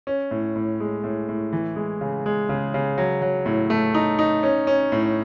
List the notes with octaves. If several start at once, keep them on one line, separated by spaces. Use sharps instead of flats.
C#4
A2
A2
G#3
A2
A2
E3
G#3
C#3
G#3
C#3
C#3
F#3
F#3
A2
A3
D#4
D#4
C#4
C#4
A2